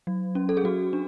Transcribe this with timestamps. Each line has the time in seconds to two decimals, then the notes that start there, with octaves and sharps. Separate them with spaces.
0.07 F#3
0.35 C#4
0.49 A4
0.57 G#4
0.64 F#3 F#4
0.93 D4